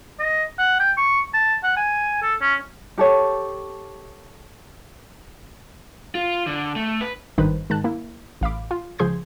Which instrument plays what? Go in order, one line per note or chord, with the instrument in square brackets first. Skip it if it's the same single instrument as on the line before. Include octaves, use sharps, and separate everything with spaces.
[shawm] D#5
F#5
G5
C#6
A5
F#5
G#5
A4
C#4
[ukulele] G4 A4 C#5
[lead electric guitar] F4
D3
A3
B4
[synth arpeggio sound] G#1 G2 D#3 D#4 B4 C5
G#2 D#3 A5 F#6
A#3 E4
A1 F5 B5 D6
F4
C#2 F3 G#4 C6 G6 G#6